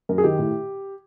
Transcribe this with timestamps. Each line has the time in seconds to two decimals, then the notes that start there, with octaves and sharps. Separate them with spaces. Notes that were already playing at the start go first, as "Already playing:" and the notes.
0.09 F#2 A#4
0.18 G#4
0.24 D#3 G4
0.39 A2